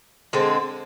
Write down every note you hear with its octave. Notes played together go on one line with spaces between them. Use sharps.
D3 G#3 C4